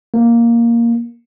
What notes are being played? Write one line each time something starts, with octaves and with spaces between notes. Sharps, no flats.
A#3